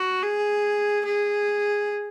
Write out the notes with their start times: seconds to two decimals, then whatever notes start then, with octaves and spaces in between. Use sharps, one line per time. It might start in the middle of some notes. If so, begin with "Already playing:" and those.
Already playing: F#4
0.23 G#4
1.05 G#4